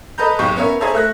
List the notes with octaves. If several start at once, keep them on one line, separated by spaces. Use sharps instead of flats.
A4 B4 D#5 A#5 G6
F#1 B1 G#2 G4 C#6 G6
B3 C#4 A#4 C#5 E5
G#4 C5 C#5 E5 A5 A#5
A3 E5 F#6 A#6